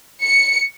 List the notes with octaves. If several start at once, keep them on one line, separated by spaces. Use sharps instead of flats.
C#7